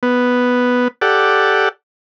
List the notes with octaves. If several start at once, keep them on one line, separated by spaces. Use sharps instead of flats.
B3
G4 A4 D5 F#5